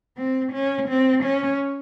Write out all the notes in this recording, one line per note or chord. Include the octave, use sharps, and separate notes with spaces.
C4
C#4
C4
C#4